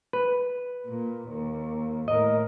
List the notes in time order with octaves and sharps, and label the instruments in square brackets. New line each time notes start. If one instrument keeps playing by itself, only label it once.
[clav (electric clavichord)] B4
[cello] A#2
D#2
[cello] A2 A#4 [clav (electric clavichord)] D#5